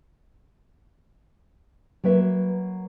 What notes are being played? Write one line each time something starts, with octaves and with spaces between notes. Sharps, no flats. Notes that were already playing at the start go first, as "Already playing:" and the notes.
F#3 A#3 B4 E5